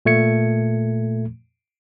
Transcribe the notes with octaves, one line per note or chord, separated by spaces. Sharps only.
A#2 A3 G#6 C#7